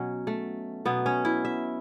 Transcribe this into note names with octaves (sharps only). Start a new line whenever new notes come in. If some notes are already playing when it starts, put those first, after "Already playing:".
Already playing: B2 F#3 C#4
A3
B2 F#3 B3
C#4
E4
E5